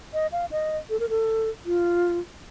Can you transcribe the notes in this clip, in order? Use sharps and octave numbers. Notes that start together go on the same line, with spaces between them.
D#5
F5
D#5
A4
A#4
A4
F4